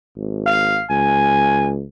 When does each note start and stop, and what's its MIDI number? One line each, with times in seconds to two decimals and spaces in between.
0.16 0.79 32
0.46 0.85 77
0.90 1.83 37
0.90 1.70 80